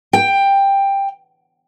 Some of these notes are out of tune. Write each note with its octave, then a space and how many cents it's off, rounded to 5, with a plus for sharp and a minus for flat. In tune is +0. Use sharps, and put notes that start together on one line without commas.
G5 +10